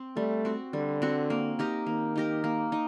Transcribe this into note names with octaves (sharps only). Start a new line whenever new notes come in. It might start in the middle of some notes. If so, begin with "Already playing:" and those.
Already playing: C4
G3 A3
C4 F#4
D3 G3
C4 F#4
A#3
D#4 G4 A#4
D#3 A#3
D#4 G4 A#4
A#3
D#4